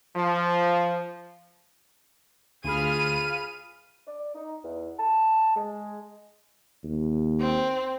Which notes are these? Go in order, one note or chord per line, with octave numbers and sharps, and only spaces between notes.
F3
D2 F4 G#4 F5 B5 F6 D#7
D5
D#4
E2
A5
G#3
D#2
C4